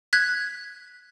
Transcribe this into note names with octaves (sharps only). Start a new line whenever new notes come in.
F#6 G#6 B6